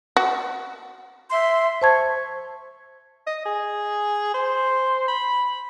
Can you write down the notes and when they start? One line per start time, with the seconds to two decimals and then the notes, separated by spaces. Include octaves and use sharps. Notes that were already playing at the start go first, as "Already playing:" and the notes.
0.17 F#4
1.31 E5 C6
1.82 C5 A5 C#6 G#6
3.26 D#5
3.45 G#4
4.34 C5
5.08 B5